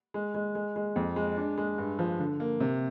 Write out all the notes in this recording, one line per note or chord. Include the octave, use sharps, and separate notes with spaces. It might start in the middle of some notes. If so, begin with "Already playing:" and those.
G#3
G#3
G#3
G#3
F2
G#3
D4
G#3
G2
F3
D3
A#3
C3